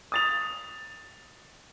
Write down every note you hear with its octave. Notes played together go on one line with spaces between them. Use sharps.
D#6 A6 F7